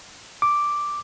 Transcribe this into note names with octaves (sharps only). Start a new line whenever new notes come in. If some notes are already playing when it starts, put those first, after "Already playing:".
D6